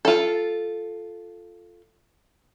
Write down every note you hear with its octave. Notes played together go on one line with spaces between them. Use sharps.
F4 A4